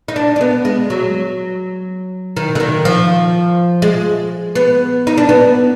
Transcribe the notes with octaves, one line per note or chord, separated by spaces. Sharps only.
D#4
D4
D4
B3
G#3
F#3
D#3
D3
D#3
F3
G#3
B3
D#4
D4
B3